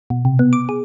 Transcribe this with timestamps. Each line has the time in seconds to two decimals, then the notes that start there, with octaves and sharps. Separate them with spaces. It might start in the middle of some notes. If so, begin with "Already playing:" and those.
0.10 B2
0.25 C3
0.39 B3
0.53 D6
0.69 G#4